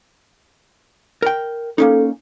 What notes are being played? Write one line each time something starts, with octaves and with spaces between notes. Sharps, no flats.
A#4 G5
A#3 C#4 D#4 A4